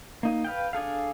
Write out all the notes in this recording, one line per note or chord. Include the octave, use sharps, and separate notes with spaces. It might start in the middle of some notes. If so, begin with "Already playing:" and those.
A#3 D#4
B4 F5 G5
D4 G#4 A4 F5